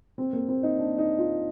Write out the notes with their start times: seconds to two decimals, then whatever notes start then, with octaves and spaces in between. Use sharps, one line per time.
0.18 C4
0.33 A#3
0.49 C4
0.63 D#4
0.78 D4
0.98 D#4
1.18 F4